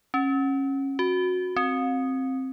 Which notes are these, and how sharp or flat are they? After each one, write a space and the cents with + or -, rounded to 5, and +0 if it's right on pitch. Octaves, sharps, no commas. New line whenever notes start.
C#4 -25
F#4 -15
C4 +10